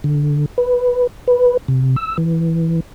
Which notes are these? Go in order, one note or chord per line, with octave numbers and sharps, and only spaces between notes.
D3
B4
B4
C3
E6
E3